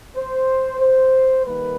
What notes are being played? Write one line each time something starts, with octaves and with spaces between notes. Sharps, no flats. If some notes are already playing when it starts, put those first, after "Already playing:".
C5
C5
D#3 G3 A#3 B4